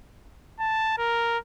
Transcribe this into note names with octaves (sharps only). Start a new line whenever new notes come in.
A5
A#4